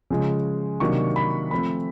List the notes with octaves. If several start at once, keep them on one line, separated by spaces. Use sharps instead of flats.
C#3 F3 G#3
C3 D#3 F#3 A#3 D4 C#6
B5
F3 A3 C4 B5